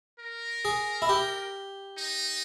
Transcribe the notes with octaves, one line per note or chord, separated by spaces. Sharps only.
A#4
G#4
E4
G4
D#4